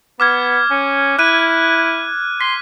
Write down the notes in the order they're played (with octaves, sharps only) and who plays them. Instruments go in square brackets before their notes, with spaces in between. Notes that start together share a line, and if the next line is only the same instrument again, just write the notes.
[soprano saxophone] B3 [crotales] D6 F6 G#6
[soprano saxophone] C#4
[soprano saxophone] E4 [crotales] F#6 D#7
[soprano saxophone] C6 [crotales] B6